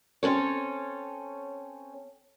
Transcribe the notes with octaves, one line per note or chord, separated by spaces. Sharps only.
C4 C#4 A4 C#5